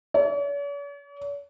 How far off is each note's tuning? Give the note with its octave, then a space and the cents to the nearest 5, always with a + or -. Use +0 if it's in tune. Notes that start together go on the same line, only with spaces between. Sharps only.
C#5 +45